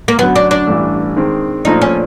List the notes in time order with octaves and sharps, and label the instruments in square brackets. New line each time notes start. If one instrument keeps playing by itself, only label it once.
[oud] A#3
[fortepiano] F#2 D3 F#3 [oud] B3
[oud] D4
D4
[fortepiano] A1 G2 E3 A3
D#3 G#3 C4
[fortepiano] A#1 A#2 F3 A3 D4 [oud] D#4
[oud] C#4